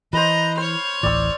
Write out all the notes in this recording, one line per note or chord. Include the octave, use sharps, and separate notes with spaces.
E3 B4 C5 D#5 A#5
C5 C#5 F6
D1 A1 E3 D5 E6